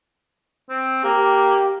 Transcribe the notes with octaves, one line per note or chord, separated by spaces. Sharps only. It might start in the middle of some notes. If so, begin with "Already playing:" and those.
C4
A#3 G4